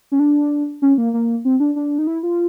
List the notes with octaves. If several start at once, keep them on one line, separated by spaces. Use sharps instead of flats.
C#4
D4
C#4
A#3
A#3
C4
D4
D4
D#4
E4
F4